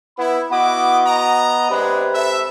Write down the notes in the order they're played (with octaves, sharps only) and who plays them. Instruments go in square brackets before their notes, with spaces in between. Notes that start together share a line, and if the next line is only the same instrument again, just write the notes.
[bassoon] B3 [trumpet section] E4 [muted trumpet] B5
[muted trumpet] B3 [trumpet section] E4 D#5 D6 [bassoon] F#4
[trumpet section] D#5 A#5
[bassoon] C3 [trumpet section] G#3 D4 [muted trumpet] B4
[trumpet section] A4 E5